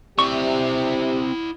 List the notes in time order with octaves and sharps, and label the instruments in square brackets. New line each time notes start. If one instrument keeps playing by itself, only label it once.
[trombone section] C3 G3 G4 [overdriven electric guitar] C4 E5 [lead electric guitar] E4 D5 [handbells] C#6